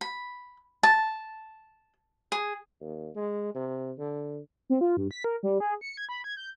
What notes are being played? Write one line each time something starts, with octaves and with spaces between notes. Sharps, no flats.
B5
A5
G#4
D#2
G#3
C3
D3
C4
F4
G2
B6
A#4
G3
G#4
C#7
G#6
B5
G#6
G6